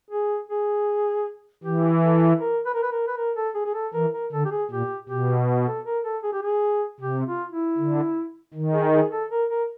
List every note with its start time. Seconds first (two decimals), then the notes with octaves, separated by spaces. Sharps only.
0.11 G#4
0.49 G#4
1.64 E3 G4
2.02 A4
2.40 A#4
2.66 B4
2.74 A#4
2.83 B4
2.92 A#4
3.08 B4
3.17 A#4
3.36 A4
3.55 G#4
3.66 G#4
3.74 A4
3.94 E3 A#4
4.13 A#4
4.32 D3 A4
4.45 G4
4.51 G#4
4.71 A#2 G4
5.08 B2 G4
5.67 A4
5.85 A#4
6.04 A4
6.24 G#4
6.33 G4
6.43 G#4
7.01 C3 G4
7.26 F4
7.52 E4
7.77 D3
8.54 D#3
8.73 G#4
8.93 G#4
9.12 A4
9.31 A#4
9.50 A#4